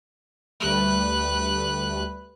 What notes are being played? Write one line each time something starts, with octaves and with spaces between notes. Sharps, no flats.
D2 G3 A3 B4 F#6